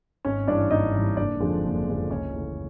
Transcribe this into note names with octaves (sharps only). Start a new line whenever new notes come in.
G#1 C#4 C#5
G2 E3 D4 D5
G#1 D#4 D#5
G2 E3
F#1 D4 D5
F2 D3 F3 G#3
F#1
F2 D3 F3 G#3
C#2 C#4 C#5
C#3 E3 A3